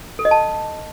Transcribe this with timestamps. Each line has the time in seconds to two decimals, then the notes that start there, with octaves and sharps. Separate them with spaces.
0.19 A4
0.25 D#5
0.31 A5